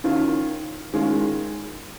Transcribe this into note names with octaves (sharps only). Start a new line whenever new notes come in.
D#3 C#4 F4
D#3 G#3 C#4 F4